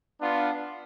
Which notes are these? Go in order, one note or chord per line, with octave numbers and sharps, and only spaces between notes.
B3 D4 F4